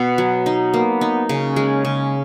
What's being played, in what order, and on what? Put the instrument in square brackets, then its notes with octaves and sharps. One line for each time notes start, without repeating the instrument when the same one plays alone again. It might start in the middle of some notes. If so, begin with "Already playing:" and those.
Already playing: [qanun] B2 [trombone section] B3
[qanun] F#3
D#4
[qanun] A#3 [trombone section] B3
[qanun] D#4
[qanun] C#3 [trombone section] C#4
[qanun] G#3
C#3